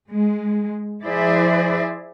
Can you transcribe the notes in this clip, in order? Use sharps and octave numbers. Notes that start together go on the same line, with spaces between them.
G#3
F3 E4 G#4 C5 D5 E5